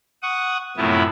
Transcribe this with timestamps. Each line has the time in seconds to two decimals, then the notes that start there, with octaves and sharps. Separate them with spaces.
0.23 F#5 C#6 D#6
0.77 F#2 A2 C3 F3 B3 E4